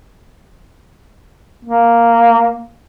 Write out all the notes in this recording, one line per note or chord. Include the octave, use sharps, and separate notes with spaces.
A#3